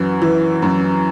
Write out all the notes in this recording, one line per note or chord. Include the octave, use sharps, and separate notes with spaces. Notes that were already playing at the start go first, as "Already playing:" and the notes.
Already playing: F#2 E3 F#4
E3
F#2